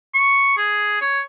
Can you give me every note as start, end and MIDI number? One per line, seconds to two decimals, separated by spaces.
0.14 0.56 85
0.57 1.00 68
1.01 1.20 73